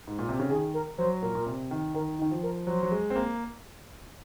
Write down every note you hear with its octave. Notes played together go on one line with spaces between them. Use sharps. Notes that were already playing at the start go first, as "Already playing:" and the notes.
G#2
A#2
C3
C#3
D#3 G#4
A#4
F#3 C5
A#2 A#4
A#2
C3
D#3
D#3 A#4
D#4
D#3
F3
A#4
F#3 C5
F#3
G#3
C4
A#3